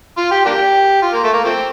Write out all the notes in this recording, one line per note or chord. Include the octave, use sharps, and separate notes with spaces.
F4
G4
A#3 D4 G4
F4
A#3
A3
A#3
F3 A3 C4